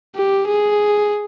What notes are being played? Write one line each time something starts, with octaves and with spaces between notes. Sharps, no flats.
G4
G#4